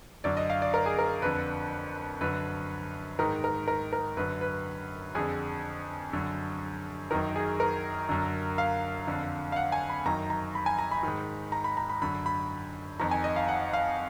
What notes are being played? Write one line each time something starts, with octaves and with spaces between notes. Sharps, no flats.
F#2 D3 D5
D#5
F5
D5
A#4
G#4
A#4
F2 D3 B4
F#2 D3 B4
G#2 D#3 A#4
A#4
A#4
A#4
F#2 D3 B4
B4
F2 D3 G#4
F#2 D3
F#2 D#3 A#4
G#4
A#4
F#2 D3
F5
F2 D3
F5
F#5
G#5
B5
F#2 D#3 A#5
A#5
B5
G#5
A#5
B5
G#2 D#3
A#5
B5
A#5
B5
F#2 D3 B5
B5
F2 D#3 A#5
G#5
D#5
F5
F#5
F5